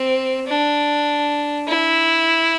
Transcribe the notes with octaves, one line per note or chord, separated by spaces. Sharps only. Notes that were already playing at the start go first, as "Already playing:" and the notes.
Already playing: C4
D4
E4